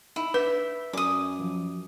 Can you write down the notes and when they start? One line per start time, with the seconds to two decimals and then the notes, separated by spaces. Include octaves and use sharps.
0.16 D#4 E4
0.34 D4 B4 E5
0.93 F#2 A#4 D5 G#5 D6 D#6
1.39 F3 F#3